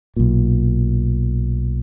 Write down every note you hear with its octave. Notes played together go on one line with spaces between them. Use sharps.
B1 A#2